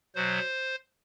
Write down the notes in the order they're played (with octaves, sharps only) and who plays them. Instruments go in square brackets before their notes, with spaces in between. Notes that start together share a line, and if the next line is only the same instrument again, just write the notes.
[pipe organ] B2 F#3 C5